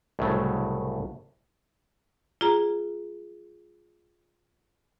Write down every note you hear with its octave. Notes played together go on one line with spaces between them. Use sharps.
C2 A2 C#3 F#3 A3
F4 G#4 A#5